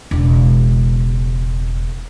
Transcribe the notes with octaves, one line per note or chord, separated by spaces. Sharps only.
E1 C#3